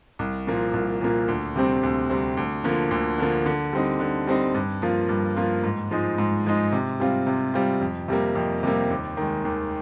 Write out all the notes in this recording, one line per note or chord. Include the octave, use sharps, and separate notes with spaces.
C2
A#2 F3 A#3
C2
A#2 F3 A#3
D2
C3 G3 C4
D2
C3 G3 C4
D2
D3 F3 A#3
D2
D3 F3 A#3
D3
G3 C4 D#4
D3
G3 C4 D#4
G2
F3 A#3 F4
G2
F3 A#3 F4
G#2
F3 G#3 D#4
G#2
F3 G#3 D#4
C3
G3 C4 F4
C3
G3 C4 F4
F2
C3 G3 A#3
F2
C3 G3 A#3
D#2
D#3 G#3
D#2